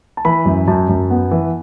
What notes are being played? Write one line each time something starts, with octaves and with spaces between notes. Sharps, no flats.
A5
E3 B5
F#2
F#2 A5
F#2
B3
E3